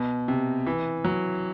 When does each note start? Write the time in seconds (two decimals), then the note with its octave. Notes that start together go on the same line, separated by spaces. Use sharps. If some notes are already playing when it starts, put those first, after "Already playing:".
Already playing: B2
0.28 C3
0.66 E3
1.05 F#3